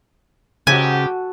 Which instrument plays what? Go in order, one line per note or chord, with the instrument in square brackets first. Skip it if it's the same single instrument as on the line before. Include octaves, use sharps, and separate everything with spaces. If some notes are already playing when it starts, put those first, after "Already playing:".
[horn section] G#2 G4 [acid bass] C#3 [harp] F#4 A4 [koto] G#5